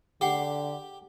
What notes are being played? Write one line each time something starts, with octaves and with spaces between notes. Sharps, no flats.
D3 G4 G#4 F#5 G5